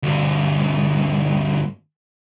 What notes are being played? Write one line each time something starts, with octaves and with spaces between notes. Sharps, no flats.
D2 G2